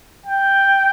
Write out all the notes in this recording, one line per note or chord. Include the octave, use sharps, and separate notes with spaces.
G5